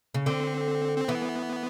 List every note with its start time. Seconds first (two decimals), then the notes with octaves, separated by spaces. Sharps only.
0.14 C#3
0.26 D3 C4
0.98 C4
1.08 E3 B3